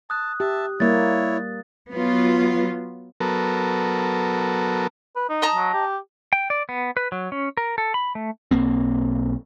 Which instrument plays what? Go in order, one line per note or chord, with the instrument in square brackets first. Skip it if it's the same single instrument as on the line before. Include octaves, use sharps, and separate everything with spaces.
[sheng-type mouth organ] A5 [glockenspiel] D#6 F#6
[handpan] G4 [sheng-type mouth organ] E5 A5
[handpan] G3 A#3 [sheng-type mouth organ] E4 C#5 [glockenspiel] A6
[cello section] F#3 B3 F4
[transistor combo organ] F#3 B3 A4 A#4
[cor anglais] B4
D#4
[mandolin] D#5 A5 A#5
[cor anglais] F#3
G4
[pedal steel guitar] G5
D5
B3
B4
F#3
C#4
A#4
A4
B5
A3
[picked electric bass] B1 A#3 C4